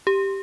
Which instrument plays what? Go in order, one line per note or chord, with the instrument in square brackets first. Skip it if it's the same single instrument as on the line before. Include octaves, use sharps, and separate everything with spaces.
[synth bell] G4